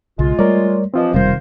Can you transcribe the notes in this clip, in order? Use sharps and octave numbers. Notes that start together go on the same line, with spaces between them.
B1 C#3 G#3 F4
G3 A3 A#4 C#5 D5
G2 E3 F3 C4 F4 D#5
E1 C3 D#3 G3 F4 A#4 C5